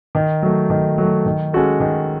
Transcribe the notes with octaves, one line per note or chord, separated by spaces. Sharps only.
D#3
F#3 A3
D#3
F#3 A3
D#3
G#3 C#4 F#4 A4
D#3